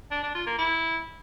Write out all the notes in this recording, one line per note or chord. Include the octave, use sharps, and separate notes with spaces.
D4
D4
F4
A#3
E4